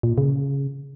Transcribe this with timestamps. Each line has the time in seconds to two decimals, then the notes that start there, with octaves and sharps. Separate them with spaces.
0.03 A#2
0.18 C#3